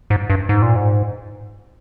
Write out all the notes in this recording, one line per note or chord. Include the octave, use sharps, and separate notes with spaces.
G#2
G2
G#2
A#2
G#2